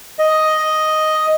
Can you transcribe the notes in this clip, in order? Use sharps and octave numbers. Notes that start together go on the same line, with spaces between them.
D#5